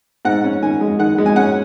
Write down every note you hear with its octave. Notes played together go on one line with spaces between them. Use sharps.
G#2 F#5
C#4
D#3 G#5
G#3
D#3 F#5
G#3
G#5
C#4 F#5